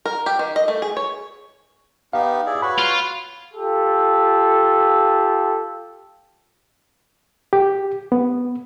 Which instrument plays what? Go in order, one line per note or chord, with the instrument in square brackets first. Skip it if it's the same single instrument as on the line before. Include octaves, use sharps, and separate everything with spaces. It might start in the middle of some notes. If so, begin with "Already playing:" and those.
[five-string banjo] A#4
G4
D#3
D#5
A3
G#4
C#5
[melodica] B3 D#4 G4 [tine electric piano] F5
[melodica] E4 G#4 D5
[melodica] F#4 B4 C#5 [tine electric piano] B5
[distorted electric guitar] F4
[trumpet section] F4 G4 A4
[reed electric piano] G4
B3